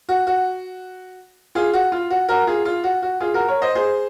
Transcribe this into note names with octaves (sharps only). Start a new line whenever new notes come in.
F#4
F#4
F4 G#4
F#4
F4
F#4
F#4 A#4
F4 G#4
F4
F#4
F#4
F4 G#4
F#4 A#4
A#4 C#5
C5 D#5
G#4 C5